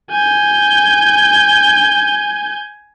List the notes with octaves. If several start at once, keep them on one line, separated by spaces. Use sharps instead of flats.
G#5 G6